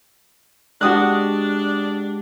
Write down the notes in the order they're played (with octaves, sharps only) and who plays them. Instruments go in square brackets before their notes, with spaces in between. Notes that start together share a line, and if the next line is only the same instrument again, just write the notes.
[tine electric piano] G#3 G4 A5 [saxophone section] D4 [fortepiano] F#4 D#6 F#6